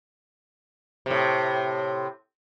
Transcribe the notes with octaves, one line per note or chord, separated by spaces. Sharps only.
A2 C3